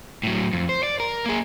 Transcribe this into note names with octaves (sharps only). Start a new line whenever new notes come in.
A2 F#3
F2
C5
D5
A#4
A#3 G#4